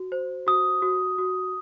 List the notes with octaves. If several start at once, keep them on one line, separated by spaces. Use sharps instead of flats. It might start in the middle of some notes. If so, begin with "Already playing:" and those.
Already playing: F#4
C5
F#4 D#6
F#4
F#4